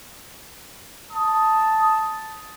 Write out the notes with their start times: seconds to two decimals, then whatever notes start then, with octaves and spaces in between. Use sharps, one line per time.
1.11 A5 D#6